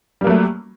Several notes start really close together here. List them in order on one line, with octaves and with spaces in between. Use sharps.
G3 A#3 F#3 A3